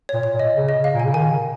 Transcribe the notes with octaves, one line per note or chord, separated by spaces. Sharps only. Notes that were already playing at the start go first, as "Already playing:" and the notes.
A#2 C#5
C#5
A#2
D#5
C#3
D#5
F5
A#2
G#5
C#3
D#3 G#5